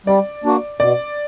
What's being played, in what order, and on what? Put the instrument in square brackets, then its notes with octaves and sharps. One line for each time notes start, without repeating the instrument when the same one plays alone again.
[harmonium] G3 [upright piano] D5
[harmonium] A#3 D4 F#4
[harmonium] B2 [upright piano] D5